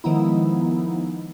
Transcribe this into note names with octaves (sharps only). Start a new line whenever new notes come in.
D#3 F3 G#3 B3 D#4 E4